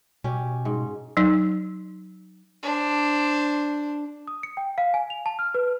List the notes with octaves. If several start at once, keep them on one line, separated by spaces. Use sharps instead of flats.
B2 C#4 G4
G#2
F#3 D#4
D4 C5
D#6
C#7
G5
F5
G#5
F7
A5
F6
B4